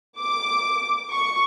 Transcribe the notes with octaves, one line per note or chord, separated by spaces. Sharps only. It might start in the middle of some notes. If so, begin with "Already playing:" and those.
D6
C#6